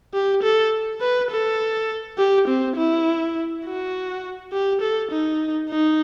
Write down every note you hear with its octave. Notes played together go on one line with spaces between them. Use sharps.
G4
A4
B4
A4
G4
C4
E4
F#4
G4
A4
D#4
D#4